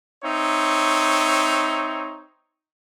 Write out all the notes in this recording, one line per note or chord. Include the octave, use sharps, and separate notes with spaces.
C4 D#4 C#5 E5